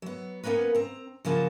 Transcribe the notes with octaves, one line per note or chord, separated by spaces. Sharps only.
F#3 B3
A#3 B3 C#4 A#4 B4
C4 A#5
C#3 F3 A#3 F4 F#4 A5